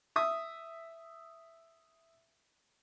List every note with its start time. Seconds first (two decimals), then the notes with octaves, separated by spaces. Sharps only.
0.16 E5 D#6